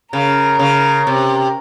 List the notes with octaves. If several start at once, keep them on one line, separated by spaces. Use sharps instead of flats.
C#3 A#4
C#3
C3